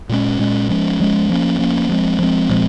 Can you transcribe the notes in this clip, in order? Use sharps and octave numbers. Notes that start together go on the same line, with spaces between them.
A#2 G#3 C#4
A#2 G#3 C#4
F3 G#3 C#4
F3 G#3 C#4
F3 A#3 C#4
F3 A#3 C#4
F3 G#3 C4
F3 G#3 C4
A#2 F3 G#3 C4